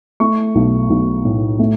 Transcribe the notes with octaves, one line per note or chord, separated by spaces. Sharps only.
A3 C#6
B1
B1
A2
A3